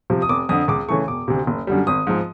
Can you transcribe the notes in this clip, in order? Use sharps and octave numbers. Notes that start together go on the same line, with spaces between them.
C3 F3
D#6
F1 D6
F2 D3 D#6
C#2 D6
C#3 E3 A3 C#6
E1 D6
D2 C3
F#1
F#2 D3 G3
G#1 D#6
G#2 F3